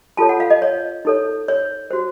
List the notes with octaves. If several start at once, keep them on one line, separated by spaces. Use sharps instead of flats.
F4 A4 C#5 A5
F#5
F5
D#5
C#5
D#4 A4 C#5
C#5
F#4 C5